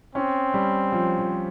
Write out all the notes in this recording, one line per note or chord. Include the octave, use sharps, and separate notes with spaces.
C4 C#4
G3
F3
F3